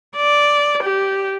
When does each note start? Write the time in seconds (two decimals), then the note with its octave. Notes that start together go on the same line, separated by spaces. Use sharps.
0.16 D5
0.83 G4